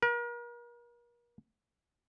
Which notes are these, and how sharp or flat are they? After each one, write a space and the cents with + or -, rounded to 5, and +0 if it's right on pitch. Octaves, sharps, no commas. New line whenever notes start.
A#4 +40